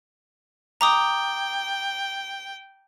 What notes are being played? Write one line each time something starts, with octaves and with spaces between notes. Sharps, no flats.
G5 A#5 D6 D#6